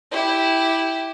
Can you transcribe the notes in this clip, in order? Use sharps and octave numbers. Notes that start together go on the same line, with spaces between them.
E4 G4